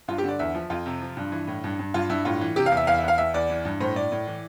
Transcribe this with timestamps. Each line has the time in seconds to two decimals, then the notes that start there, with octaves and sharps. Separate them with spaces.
0.08 G2 F4
0.18 G4
0.24 D3 D5
0.39 E2 E5
0.55 F3
0.70 F2 F4
0.86 C3
1.02 F3
1.17 G2
1.32 E3
1.47 A2
1.64 G2
1.79 G2
1.94 G2 F4
2.10 G2 E4
2.25 A2 F4
2.41 E3
2.56 C3 G4
2.66 F5
2.72 E2
2.77 E5
2.87 E2 F5
2.98 E5
3.04 E2 F5
3.18 E2 E5
3.34 E2 D5
3.49 E3
3.65 G2
3.80 A2 C5
3.96 A2 D5
4.12 A2
4.27 E3